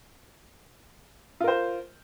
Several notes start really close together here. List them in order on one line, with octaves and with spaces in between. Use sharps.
F4 A#4 C5